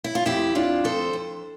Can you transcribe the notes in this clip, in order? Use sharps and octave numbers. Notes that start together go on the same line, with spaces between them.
E4
F4
F2 E4 G4
F2 D4 F4
F2 A4 C5
F2